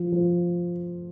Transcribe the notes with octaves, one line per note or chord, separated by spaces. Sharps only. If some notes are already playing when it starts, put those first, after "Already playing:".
Already playing: F3
F3